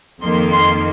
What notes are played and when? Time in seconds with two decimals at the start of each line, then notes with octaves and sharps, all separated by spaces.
0.21 F2 D#3 A#3 C6
0.52 C6